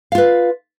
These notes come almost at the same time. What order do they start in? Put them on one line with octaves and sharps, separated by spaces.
F5 F4 B4